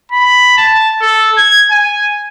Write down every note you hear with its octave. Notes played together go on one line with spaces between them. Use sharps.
B5
A5
A4
G#6
G#5